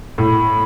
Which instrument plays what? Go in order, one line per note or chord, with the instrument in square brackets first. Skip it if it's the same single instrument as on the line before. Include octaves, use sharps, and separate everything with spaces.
[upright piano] A2 [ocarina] B5